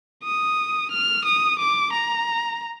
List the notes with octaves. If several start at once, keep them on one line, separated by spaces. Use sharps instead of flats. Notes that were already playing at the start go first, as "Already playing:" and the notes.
D#6
F6
D#6
D6
A#5